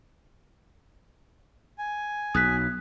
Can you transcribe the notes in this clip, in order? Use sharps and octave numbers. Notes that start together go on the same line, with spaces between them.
G#5
B1 D#6 F#6 B6